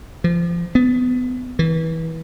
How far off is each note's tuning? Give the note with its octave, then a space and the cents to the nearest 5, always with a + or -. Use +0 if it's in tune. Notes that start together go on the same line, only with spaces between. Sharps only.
F3 -30
B3 +20
E3 -25